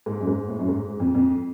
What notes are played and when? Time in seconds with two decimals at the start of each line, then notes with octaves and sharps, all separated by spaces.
0.06 G#2
0.21 F#2
0.27 G#2
0.48 A2
0.59 F#2
0.69 G#2
1.00 F2
1.15 F2